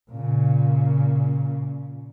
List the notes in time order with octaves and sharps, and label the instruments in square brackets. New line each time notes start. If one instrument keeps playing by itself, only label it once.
[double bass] A#2 C#3